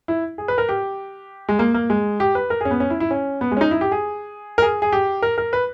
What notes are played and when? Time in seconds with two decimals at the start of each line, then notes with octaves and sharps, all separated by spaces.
0.08 E4
0.38 G#4
0.48 B4
0.58 A#4
0.69 G4
1.49 G#3
1.59 A#3
1.74 A#3
1.90 G#3
2.20 G4
2.35 B4
2.50 A#4
2.61 G#4
2.65 C#4
2.71 B3
2.80 C#4
2.90 E4
3.00 E4
3.11 C#4
3.41 B3
3.51 G#3
3.57 C#4
3.61 D#4
3.71 E4
3.81 G4
3.92 G#4
4.58 A#4
4.62 G#4
4.82 G#4
4.92 G4
5.22 A#4
5.38 A#4
5.53 B4